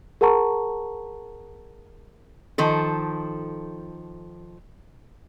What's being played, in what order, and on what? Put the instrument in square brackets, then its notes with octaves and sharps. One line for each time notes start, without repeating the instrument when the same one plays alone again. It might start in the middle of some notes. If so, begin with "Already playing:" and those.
[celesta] G#4 A#4 F#5 A5 A#5 C#6
[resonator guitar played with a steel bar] D#3 F3 A4